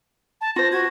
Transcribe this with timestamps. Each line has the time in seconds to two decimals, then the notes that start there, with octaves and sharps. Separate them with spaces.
0.41 A5
0.56 F4 C5 A#6
0.72 F#4 G#6